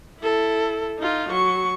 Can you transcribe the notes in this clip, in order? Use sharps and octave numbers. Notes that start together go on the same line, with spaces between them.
E4 A4
D#4 F4
F#3 C#6